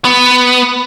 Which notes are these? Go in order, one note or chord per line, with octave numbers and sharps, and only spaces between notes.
B3